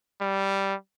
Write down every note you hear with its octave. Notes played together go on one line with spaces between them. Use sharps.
G3